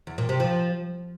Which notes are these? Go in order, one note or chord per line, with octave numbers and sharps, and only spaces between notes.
E2
A#2
C3
F3